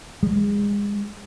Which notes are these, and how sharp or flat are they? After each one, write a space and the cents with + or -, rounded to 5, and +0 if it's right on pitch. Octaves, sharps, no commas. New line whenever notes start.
G#3 -30